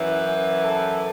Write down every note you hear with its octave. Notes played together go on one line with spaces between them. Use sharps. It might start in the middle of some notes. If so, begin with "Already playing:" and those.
Already playing: F#2 E3
A4